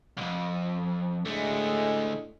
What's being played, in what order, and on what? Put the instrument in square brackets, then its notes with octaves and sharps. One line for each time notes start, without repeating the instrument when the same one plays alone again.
[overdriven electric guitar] B1 F2
[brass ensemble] A2 G#3 [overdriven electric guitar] D3 A3